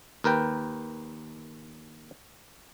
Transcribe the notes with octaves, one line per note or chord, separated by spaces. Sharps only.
D#2 A#4 B4 G5